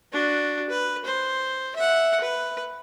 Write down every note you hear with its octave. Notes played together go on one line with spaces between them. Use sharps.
D4 F#4
B4
C5
E5 F#5
B4